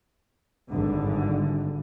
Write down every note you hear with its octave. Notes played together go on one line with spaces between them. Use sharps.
G#1 G2 D3